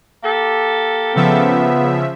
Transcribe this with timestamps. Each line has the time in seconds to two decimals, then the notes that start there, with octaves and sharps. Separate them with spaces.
0.24 A#3 G4 A4
1.16 C#3 F3 B3 E5